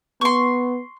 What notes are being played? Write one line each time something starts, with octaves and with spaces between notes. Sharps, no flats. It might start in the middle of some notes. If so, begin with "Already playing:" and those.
B3 C6 C#6